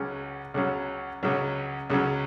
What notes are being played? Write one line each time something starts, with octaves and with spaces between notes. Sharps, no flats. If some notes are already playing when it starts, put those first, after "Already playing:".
Already playing: C#2 C#3 F#3 C#4
C#2 C#3 F#3 C#4
C#2 C#3 F#3 C#4
C#2 C#3 F#3 C#4